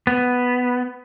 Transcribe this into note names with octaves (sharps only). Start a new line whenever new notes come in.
B3